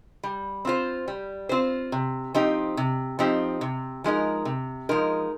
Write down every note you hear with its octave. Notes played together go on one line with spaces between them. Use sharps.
G3
C4 F4 C5
G3
C4 F4 C5
C3
F3 C4 D#4 G4
C3
F3 C4 D#4 G4
C3
F3 G#3 D#4 A#4
C3
F3 G#3 D#4 A#4